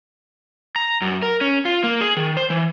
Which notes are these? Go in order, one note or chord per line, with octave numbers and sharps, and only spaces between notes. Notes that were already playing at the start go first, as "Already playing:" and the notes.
A#5
F#2
A#4
C#4
F4
A#3
G#4
D#3
C5
E3